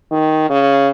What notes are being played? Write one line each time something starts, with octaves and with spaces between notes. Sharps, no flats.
D#3
C#3